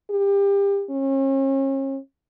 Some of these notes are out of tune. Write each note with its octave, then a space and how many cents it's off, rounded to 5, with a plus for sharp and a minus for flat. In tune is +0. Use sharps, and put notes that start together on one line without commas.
G4 +30
C#4 -40